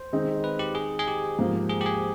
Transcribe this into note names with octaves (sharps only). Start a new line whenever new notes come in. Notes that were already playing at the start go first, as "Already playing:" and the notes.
Already playing: C5
D#3 G#3 C4 D#4
B4
G4
G#4
G#4
G4
G#2 F3 A#3
G#4
G4
G#4